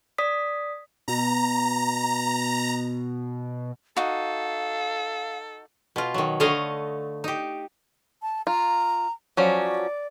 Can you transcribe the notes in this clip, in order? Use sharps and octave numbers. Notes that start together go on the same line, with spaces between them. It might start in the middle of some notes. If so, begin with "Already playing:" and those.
D5 D#6 B6
B2 A#5
D#4 F#4 A4 F5
B2 F4
D#3 F#3
D3 A3 C#5 D#5 F5
D#4 G4
A5
F4 A#5
F3 F#3 C#4 D5